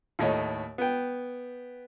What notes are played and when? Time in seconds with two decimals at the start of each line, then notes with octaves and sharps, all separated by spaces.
0.19 D#2 A2 C#5 D#5
0.78 B3 G5